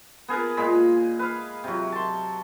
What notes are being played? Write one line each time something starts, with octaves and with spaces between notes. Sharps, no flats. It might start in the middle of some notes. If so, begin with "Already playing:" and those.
B3 G#4 A#4 B4
A#2 G#3 G#4 B5
B4 F5
C3 F#3
A5 C6